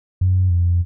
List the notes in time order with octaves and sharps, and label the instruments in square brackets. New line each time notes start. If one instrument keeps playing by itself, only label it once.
[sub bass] F#2
F2